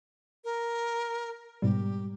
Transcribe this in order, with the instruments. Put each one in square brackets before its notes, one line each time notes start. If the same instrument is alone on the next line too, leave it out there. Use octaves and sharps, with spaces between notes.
[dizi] A#4
[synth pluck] G#2 B2 G3 [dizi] G4